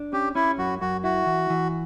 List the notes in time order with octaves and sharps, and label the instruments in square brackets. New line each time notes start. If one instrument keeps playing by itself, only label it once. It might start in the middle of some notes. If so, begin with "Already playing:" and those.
Already playing: [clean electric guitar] D4
[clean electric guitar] C#4 [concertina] G4
[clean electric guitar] C#4 [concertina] E4
[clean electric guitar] F#2 [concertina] F#4
[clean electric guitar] F#2 [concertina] F#4
[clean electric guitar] E4 [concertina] F#4
[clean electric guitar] E3
E3